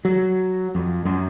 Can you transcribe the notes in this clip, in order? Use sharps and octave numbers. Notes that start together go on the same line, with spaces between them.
F#3
F2
F#2